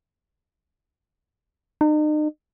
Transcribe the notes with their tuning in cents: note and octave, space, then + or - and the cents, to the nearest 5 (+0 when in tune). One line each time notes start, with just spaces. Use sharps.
D#4 -40